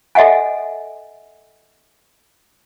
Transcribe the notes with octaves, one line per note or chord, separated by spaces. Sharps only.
A4 D#5 E5 F#5 G#5